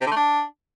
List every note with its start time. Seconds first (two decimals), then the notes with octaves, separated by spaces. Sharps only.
0.01 C3
0.06 D3
0.11 A3
0.16 D4